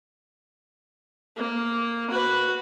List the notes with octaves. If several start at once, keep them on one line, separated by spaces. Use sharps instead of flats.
A#3
F#4 B4